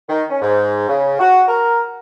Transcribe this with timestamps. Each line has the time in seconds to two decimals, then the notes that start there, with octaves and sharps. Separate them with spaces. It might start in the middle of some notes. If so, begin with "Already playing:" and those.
0.09 D#3
0.30 C#4
0.42 G#2
0.89 C#3
1.19 F#4
1.48 A#4